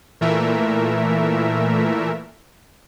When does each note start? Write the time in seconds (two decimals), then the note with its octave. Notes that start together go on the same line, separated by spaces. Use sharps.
0.21 A#2 E3 A3 A#4 E5